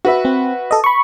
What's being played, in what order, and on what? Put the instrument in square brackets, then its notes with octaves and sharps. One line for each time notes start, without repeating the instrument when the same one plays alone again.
[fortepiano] F#4 B4 E5
[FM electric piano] C4
A4 D#5
B5 C#6